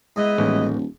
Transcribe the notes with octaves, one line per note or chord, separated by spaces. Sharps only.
G#2 B3 E4 D#5
D#1 A1